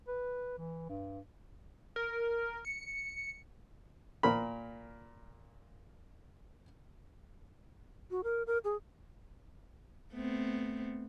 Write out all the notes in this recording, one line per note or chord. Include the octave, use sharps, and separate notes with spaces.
B4
E3
G2
A#4
C#7
A#2 A#4 B5
F#4
A#4
A#4
G#4
A3 B3 C4